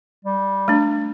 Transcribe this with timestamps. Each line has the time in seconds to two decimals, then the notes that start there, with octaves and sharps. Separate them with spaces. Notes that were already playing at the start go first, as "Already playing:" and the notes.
0.24 G3
0.68 A3 D4